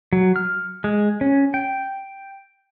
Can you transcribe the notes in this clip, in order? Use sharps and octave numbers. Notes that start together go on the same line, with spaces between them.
F#3
F6
G#3
C#4
G5